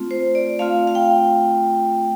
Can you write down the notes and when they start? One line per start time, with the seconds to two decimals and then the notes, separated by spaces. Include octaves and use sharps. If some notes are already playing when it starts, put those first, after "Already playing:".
Already playing: A3 C4 F4
0.11 C5
0.35 D5
0.59 A3 C4 F4 F5
0.87 F5
0.95 G5